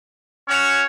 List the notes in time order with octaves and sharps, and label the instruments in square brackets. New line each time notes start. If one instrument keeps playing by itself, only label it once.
[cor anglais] C#4 [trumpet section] F#4 C#5